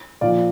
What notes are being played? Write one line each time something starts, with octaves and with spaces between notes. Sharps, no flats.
A#2 F3 D5 F5